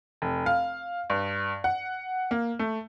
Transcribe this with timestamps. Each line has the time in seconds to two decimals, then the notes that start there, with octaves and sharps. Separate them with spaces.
0.22 F1
0.46 F5
1.10 G2
1.64 F#5
2.31 A#3
2.59 A3